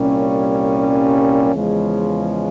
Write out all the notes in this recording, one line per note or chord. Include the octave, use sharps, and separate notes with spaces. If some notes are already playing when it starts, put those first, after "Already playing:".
Already playing: C2 A#2 G3 A#3 C#4
E2 C#3 F3 G#3